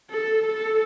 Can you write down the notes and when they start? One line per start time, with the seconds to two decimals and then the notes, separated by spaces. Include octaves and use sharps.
0.10 A4
0.46 A4